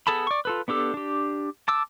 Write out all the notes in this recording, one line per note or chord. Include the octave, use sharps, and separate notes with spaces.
B3 G#4 A4 A5 B5
D5 C#6
F4 A4 B4
B3 D4 G4 A4
D4 G4
A5 D6 E6